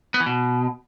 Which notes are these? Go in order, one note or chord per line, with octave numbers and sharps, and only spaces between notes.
B3
E3
B2